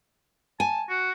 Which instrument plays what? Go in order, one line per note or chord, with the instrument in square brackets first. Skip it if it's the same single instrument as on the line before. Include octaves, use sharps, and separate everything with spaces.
[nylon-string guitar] G#5 [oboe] A5
[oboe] F#4